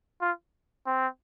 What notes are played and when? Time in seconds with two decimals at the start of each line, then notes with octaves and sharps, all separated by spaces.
0.21 F4
0.87 C4